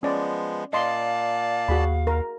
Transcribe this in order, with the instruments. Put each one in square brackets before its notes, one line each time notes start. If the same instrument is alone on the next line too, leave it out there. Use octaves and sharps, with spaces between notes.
[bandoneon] F3 G#3 B3 [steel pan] C#4 D5
[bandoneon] A#2 D5 A5 [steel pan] D#5 C6 [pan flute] F5
[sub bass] D#2 [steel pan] F#4 G#4 B5
[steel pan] A#4